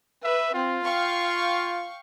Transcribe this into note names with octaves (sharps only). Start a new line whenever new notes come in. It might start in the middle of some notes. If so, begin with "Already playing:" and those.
B4 E5
C4 F4
F5 G5 C#6